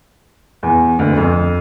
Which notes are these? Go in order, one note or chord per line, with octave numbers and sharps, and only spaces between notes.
E2
D2
F2